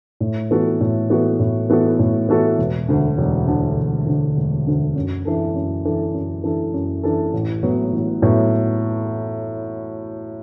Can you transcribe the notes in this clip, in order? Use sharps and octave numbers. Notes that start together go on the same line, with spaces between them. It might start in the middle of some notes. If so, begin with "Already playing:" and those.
A2
E3 B3 F#4 A4
A2
E3 B3 F#4 A4
A2
E3 B3 F#4 A4
A2
E3 B3 F#4 A4
E1
D2 D3
E1
D2 D3
E1
D2 D3
E1
D2 D3
F#2
E3 D4 A4
F#2
E3 D4 A4
F#2
E3 D4 A4
F#2
E3 D4 A4
A1
A2 F#3 B3
A1
A2 F#3 B3